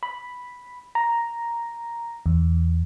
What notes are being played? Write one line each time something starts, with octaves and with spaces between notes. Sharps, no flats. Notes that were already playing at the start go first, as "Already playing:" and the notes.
B5
A#5
E2